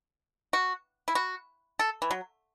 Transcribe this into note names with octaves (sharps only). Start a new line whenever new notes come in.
F#4
E4
F#4
A4
E3
F#3